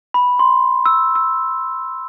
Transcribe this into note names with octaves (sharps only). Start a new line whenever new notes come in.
B5
C6
E6
E6